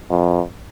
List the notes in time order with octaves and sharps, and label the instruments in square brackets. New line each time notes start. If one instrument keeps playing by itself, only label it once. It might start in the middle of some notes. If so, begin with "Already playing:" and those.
[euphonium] F2